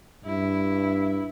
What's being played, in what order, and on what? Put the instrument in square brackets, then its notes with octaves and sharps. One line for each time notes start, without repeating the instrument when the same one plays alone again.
[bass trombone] G2 [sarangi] E4